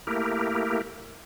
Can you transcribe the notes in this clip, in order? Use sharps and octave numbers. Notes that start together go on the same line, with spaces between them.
A3 A#3 E4 G4 A#4